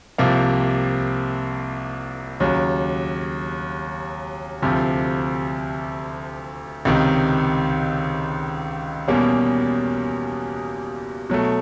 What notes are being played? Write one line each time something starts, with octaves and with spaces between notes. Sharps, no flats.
C2 C3 F3 A#3
D#2 C#3 F#3
D2 C3 F3
C#2 C3 D#3
E2 B2 G3 A#3 C#4
B2 F#3 A3